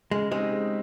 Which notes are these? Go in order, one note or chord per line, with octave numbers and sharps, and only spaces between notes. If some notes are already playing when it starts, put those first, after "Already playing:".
C#3 G#3
G3 G#3 C4 D#4 G4
C#3